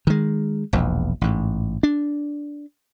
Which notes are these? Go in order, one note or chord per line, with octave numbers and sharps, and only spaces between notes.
D#3 G#3
E1 A#1 E2
A1 G#2
D4